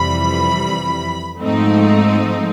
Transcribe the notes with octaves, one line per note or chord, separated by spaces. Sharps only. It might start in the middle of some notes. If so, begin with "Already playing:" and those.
Already playing: F2 C3 E3 G3 B5
G#2 F3 A3 C4 D#4